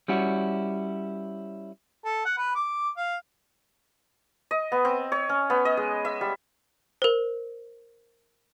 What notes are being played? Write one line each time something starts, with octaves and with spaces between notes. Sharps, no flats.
G3 C#4 E4 F#4
A4
F#5
B4
D6
F5
D#5
B3
C4
C#5
C#4
B3
D#5
G#3
E5
G3
A#4 C5